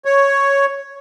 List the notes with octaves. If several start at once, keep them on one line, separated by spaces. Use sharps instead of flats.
C#5